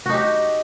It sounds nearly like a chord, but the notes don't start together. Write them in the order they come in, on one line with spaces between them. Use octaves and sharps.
F#4 D#4 G4